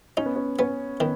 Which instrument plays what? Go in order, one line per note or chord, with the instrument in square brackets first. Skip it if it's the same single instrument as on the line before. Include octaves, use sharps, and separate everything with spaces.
[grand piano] C#4 [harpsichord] D#4
[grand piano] B3
C#4
[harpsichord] B3 [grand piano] C#4
[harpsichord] D#3 [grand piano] B3